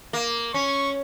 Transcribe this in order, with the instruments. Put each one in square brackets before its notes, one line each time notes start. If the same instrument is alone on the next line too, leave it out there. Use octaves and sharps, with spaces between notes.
[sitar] A#3
[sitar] C#4 [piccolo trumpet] C#6